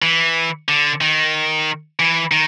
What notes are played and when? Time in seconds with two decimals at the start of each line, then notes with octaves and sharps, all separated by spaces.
0.02 E3
0.68 D3
1.01 D#3
1.99 E3
2.31 D#3